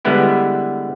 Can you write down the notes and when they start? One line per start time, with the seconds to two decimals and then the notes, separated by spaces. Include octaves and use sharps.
0.05 D3 G3 G#3 B3 E4 G4